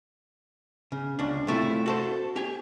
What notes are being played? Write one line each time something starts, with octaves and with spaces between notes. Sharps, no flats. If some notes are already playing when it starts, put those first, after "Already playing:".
C#3
C#2 D4
C3 A3 E4 F4
F#4 A4 C5
G4 G#5